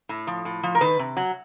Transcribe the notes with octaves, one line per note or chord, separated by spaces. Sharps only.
A2
F3
A2
F3
A#4
D#3 B4
C3
F#3